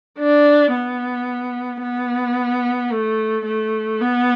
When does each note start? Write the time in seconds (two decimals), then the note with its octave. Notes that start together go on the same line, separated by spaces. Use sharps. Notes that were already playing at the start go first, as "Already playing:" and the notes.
0.19 D4
0.73 B3
1.82 B3
2.91 A3
3.45 A3
4.00 B3